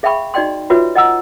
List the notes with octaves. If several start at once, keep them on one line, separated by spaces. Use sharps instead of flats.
G#4 E5 F5 G5 B5 C#6
D#4 F#4 D5 D#5 G5 C6
F4 F#4 B4 C#5 E5
D#5 F#5 A#5 E6